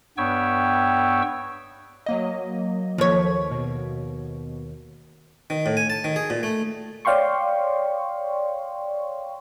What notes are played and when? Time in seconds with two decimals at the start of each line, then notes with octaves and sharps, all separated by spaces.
0.18 G2 B3 C#5 G5 C#6 E6
2.06 F#3 A#3 D#5
2.98 D#2 F3 C#5 B6
3.51 B2
5.50 D#3
5.66 A2
5.77 G#5
5.90 A5
6.04 D#3
6.16 G#4
6.30 A#2
6.43 A3
7.05 C#5 D5 F5 G5 C6 C#6